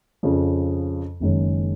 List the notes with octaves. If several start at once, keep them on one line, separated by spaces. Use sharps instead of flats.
F2 C#3 F3
F#1 F#2 D#3 G#3 C#4